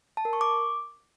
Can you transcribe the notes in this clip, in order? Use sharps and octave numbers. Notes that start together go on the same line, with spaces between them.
A5
A#4
C#6
D6